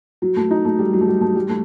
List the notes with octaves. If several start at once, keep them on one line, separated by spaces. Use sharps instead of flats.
F#3
A3
D#4
A3
G3
F#3
A3
G3
A3
G3
A3